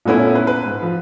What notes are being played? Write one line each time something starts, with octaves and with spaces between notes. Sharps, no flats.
A#2 A3 B3 C#4 E4
B4
B4
G#2
F3